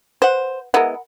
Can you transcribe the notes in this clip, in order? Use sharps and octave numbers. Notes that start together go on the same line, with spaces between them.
B4 C5 F#5
G#3 B3 E4 A#4 F#5